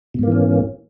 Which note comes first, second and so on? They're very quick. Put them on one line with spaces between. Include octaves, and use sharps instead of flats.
B2 G#2 A#3 E3 C#4